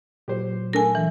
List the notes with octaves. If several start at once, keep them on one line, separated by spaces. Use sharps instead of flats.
A#2 F#3 G4 C5
A3 D4 A#4 G#5
E3